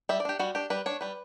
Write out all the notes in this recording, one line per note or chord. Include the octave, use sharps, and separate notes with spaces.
G3 E5
D5
D4 G4
G3 F#4
D4 G4
G3 B4
D4 C#5
G3 B4